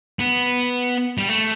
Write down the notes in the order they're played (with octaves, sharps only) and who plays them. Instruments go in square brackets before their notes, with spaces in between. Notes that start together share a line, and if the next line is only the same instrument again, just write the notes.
[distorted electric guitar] B3
G3
A3